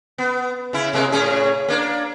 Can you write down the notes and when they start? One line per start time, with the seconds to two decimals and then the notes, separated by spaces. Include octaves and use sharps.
0.18 B3
0.73 C#3 E4
0.93 C3 G#3 A#3
1.12 A2 C#4 G#4
1.68 A#3 D4